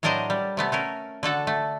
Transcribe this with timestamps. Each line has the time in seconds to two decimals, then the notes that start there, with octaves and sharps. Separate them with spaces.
0.03 A2 F#3 D4 A#4 C5 D#5
0.30 G3
0.57 C3 A3 B3
0.72 A3 C#4 A#4
1.23 D3 F#4 A4 F#5
1.47 A3